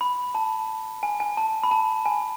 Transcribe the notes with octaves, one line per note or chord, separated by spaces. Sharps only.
B5
A5
G#5
G#5
A5
B5
A5
G#5